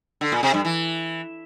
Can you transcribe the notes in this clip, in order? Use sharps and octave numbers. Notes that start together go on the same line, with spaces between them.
D3
A#2
C3
G2
E3